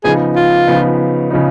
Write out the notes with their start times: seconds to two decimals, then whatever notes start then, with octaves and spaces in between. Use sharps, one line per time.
0.04 C#3 F3 B3 D#4 G#4
0.36 F4
0.67 C#3 F3 B3 D#4
1.30 C#3 F3 B3 D#4